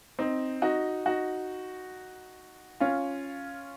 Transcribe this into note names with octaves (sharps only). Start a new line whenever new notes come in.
C4 D#4
D#4 F#4
D#4 F#4
C#4 F4